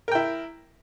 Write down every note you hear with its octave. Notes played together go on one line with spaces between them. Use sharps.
E4 A#4 G5